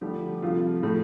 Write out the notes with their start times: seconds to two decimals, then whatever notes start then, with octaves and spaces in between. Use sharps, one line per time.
0.01 D3 F3 G3 A3 G4
0.42 C3 F3 A3 F4 F5
0.83 A2 F3 A3